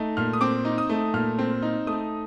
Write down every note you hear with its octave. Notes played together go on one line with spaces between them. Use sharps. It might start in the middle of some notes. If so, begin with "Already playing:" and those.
Already playing: A3 D#4
A#2 F6
D#6
C4 D6
D#4
D#6
A3
A#2 F6
C4
D#4
A3 D#6